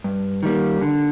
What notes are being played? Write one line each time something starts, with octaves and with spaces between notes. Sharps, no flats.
G2
D#3 G3 A#3
D3